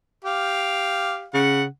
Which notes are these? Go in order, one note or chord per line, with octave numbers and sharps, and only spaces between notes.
G4 F5
C#3 F#5